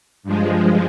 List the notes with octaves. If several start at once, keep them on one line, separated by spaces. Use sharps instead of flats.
G2 F3 G#3